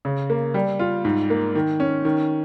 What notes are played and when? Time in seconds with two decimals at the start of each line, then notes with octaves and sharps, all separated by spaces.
0.05 C#3
0.30 A#3
0.54 G3
0.79 F4
1.05 G#2
1.30 A#3
1.55 D#3
1.80 C#4
2.05 D#3